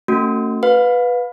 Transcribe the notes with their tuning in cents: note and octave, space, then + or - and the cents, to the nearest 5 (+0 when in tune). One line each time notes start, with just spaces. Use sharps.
A3 +35 C#4 +0 F#4 +0
B4 +0 F5 +30